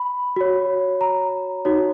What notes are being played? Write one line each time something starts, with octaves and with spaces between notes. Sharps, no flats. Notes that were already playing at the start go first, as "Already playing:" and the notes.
Already playing: B5
F#4 C#5
A#5
D#4 F#4 C#5